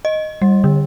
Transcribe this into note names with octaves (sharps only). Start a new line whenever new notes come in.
D#5
G3
D3